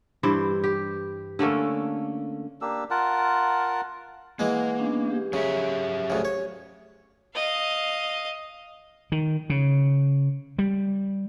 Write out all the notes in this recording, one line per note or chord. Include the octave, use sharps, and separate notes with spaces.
G2 E3 C5 D5
G4
D3 A3 A#3 C#4
A#3 D4 G4 E6
F4 A#4 F#5 A5
E3 G#3 A#3 F#5
B3 C#4 D4
G4
C#3 F#3 C#4 E5
D2 C#3
C#5
D#5 F5
D#3
C#3
G3